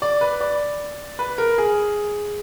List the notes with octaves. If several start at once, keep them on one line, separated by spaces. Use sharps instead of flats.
D5
B4
D5
B4
A#4
G#4